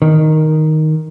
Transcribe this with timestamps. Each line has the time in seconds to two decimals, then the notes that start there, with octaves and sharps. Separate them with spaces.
0.02 D#3